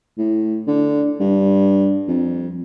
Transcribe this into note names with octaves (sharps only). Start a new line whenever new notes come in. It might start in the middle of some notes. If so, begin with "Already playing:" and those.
A2
D3
G2
F2